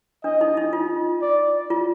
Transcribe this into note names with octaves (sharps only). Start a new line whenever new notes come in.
D4 D#5
D#4
D#4
F4
D5
F4